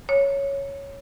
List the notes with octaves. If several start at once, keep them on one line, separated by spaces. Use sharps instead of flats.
C#5